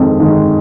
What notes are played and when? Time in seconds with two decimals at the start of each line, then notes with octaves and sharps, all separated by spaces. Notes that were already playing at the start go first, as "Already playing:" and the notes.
Already playing: F2 D#3 G#3
0.20 D#3 G#3